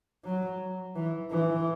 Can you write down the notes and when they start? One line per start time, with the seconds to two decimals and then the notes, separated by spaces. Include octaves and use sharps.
0.25 F#3
0.96 E3
1.31 E3